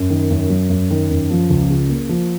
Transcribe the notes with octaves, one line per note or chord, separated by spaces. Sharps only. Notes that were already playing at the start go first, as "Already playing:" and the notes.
Already playing: F#2
D#3
F#2
F#3
F#2
D#3
F#2
F3
C#2
C#3
A#3
F3